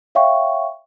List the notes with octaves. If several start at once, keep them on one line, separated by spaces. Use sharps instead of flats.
C#5 E5 F5 G5 C#6